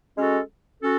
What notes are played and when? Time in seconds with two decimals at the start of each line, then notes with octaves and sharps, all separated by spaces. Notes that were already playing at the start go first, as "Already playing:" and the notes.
0.16 G#3 C#4 F#4 A4
0.80 C#4 F#4 A4